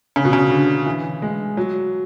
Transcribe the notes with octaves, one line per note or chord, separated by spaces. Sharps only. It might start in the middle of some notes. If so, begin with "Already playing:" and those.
C#3
B2
C#3
D3
E3
G#3
F#3